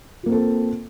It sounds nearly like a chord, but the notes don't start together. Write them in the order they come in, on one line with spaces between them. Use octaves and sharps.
F4 A#3 C4 A4